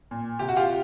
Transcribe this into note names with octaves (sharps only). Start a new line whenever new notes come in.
A#2
C3 G4
F#4
F4 G4